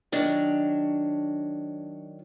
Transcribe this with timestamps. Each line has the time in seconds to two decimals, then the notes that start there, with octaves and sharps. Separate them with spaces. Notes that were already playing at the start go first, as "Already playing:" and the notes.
0.12 D#3 F#3 D4